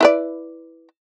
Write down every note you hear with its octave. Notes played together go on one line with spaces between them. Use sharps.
E4 B4 D5